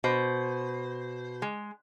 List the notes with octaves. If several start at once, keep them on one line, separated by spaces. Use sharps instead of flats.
B2 C5
G#3